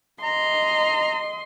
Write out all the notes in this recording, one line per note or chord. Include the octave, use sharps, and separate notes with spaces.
D#5 A#5 C6